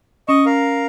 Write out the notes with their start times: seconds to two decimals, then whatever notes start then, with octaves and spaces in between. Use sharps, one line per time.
0.29 C#4 D#5 C#6
0.46 A#4 F5